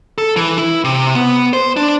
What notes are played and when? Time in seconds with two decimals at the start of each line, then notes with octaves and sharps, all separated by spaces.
0.18 A4
0.36 E3
0.58 E4
0.84 C3
1.15 B3
1.53 C5
1.77 D4